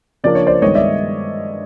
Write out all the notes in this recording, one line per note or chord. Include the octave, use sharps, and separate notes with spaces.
C#3 F3 A#3 D4 D5
C#5
C5 D5
G2 D#3 G#3 B3 C#5 D#5
D5 E5